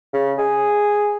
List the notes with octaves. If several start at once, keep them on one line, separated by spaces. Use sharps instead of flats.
C#3
G#4